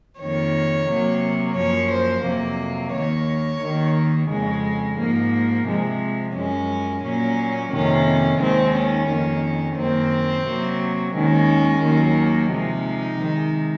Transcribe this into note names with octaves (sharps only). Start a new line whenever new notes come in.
F2 D#3 A#3 C#5
C3 F#3 A#3
F#2 F3 A#3 C#5
C5
F2 C3 F#3 A#3
D#2 D#3 A#3 C#5
D#2 D#3 A#3
F2 C#3 G#3
G#2 F3 A#3
C3 F3 G#3
F#2 F3 G#3 C#4
A#2 F#3 A#3 C#4
F2 C3 D#3 A#3 C#4
D#2 D#3 G#3 C4
C#4
F2 D#3 A#3
F#2 D#3 A#3 C4
C3 F#3 A#3
D#2 D#3 G#3 C#4
D#2 D#3 F#3 A#3
C3 F3 G#3 D#4
C3 D#3 G#3